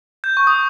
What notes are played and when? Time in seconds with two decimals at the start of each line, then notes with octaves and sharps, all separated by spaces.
0.24 G6
0.37 C#6
0.47 D#6